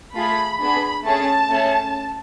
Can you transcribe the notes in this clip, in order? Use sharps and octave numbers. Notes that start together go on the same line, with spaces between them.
A3 F4 G#4 B5
B3 D4 G#4 B5
A3 C#4 G#4 A5
A3 C#4 G#4